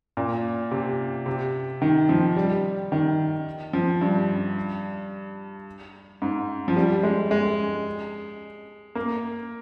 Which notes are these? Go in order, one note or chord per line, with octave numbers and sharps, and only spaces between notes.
A#2
C3
C3
D#3
F3
G3
D#3
F3
G2
G#2
F3
G3
G#3
G#3
A#3